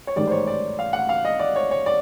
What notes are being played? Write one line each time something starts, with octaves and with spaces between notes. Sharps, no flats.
C#5
A1 G#2 D#3 G3 D5
C5
C#5
D5
F5
F#5
F5
D#5
D5
C#5
C#5
D5